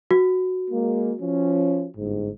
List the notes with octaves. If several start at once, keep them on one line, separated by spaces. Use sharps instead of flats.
F#4
G#3 A#3
F3 C#4
G1 G#2